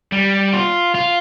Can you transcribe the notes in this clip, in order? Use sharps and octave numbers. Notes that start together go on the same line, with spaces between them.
G3
F4
F4